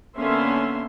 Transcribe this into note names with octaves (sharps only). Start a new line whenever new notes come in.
D3 A#3 B3 C#4 E5 C6